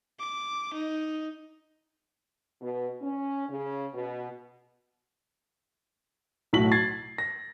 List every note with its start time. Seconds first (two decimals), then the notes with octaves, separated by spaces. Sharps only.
0.19 D6
0.74 D#4
2.61 B2
3.01 C#4
3.49 C#3
3.94 B2
6.53 B1 A2 F#4 B6 F#7
6.72 G#6 A6 C7
7.18 A#6